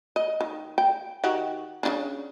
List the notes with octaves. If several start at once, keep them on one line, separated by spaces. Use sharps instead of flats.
D#5
D#3
G5
D#3 F#4 G4
C#3 C#4 D4